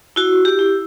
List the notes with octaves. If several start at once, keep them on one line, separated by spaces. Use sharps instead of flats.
E4 F#4
G4
E4